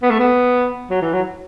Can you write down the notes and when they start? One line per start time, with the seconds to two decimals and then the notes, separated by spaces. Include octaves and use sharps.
0.02 B3
0.10 A3
0.19 B3
0.90 F#3
1.02 E3
1.13 F#3